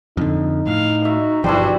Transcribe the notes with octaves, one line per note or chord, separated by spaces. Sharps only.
F2 D3 D#4
A2 F5
F#4 E5
G1 B2 F3 G3 D4 E4 F#4 C5